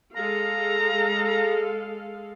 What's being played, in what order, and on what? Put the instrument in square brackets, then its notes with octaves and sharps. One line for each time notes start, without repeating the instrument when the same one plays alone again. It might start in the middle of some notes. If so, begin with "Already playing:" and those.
[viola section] G#3 A4 F5 [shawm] A#5